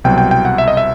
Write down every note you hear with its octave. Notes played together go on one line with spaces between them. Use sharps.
C2 B2 F#3 G5
G5
G5
F#5
E5
D#5
E5